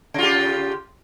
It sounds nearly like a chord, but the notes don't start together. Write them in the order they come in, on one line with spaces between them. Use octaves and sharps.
C#3 F4 G4